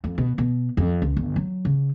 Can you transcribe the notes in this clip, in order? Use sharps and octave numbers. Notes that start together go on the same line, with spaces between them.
F2
B2
B2
F2
C#2
G1
F#3
C#3